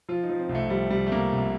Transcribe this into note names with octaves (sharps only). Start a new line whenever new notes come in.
F3 F4
D#4
F3
C4
C2
A3
F3 G3
C2 G3
A3
C2 A#3
C2